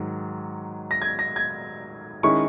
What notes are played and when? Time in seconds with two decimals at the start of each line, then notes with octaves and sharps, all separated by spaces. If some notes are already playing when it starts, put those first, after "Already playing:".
Already playing: G#2 D#3 F#3
0.91 A#6
1.02 G#6
1.19 A#6
1.36 G#6
2.23 D#3 G#3 C#4 E4 C#6